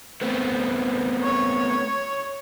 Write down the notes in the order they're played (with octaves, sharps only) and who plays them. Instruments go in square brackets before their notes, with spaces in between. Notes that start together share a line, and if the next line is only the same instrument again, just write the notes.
[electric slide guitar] A3 B3 C4
[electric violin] C#5